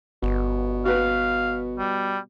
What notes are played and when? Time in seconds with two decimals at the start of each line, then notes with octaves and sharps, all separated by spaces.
0.23 G1 B2
0.85 F#4 B4 F5
1.79 G3